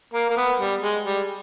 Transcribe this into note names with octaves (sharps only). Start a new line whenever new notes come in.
A#3
A#3
B3
G3
G#3
G3